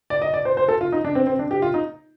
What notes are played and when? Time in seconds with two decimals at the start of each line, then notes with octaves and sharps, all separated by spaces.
0.10 D5
0.22 D#5
0.34 D5
0.45 C5
0.57 C5
0.68 A4
0.81 F4
0.92 D#4
1.04 D4
1.15 C4
1.27 C4
1.39 D4
1.51 G4
1.62 F4
1.74 D#4